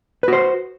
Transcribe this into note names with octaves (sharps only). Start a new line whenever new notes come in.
F#4 B4 C5